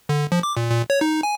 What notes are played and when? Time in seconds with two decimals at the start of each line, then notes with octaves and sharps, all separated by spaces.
0.09 D3
0.32 F3
0.43 D6
0.57 A#2
0.70 A#2
0.90 C#5
1.01 D#4
1.23 G#5